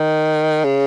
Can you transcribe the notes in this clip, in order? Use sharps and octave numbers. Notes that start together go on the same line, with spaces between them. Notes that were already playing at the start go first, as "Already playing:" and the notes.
Already playing: D#3
C#3